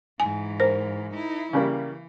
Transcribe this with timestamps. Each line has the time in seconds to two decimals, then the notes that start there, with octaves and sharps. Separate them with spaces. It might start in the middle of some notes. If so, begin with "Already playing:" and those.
0.20 G#2 E3 G#5
0.60 A#4 C5
1.14 D#4 E4
1.53 C#3 E3 G3 A#3